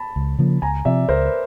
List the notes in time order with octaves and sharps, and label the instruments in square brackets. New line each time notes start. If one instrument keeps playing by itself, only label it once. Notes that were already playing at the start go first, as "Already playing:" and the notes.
Already playing: [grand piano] A5 B5
[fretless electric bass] C#2
C#3 F3 A#3
[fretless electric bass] C#2 [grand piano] G#5 A#5
[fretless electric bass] C3 F3 [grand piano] D5 E5
[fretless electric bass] C#2 [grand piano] A#4 C5
[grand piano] B4